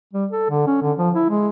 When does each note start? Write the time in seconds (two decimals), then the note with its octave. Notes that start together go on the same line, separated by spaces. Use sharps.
0.13 G3
0.31 A4
0.50 D3
0.67 C#4
0.82 D3
0.98 F3
1.15 E4
1.29 G#3